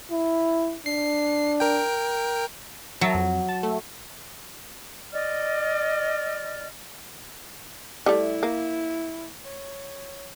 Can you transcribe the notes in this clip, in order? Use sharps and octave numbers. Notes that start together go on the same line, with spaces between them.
E4
D4 C7
A#4 G5
F#3 E5 A5 A#5
F2
A5
A3
D5 D#5 F6
G3 A3 E4
A#3
C#5